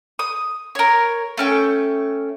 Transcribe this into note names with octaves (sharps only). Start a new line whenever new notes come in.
D#6
A#4 C#5
A3 C#4 G5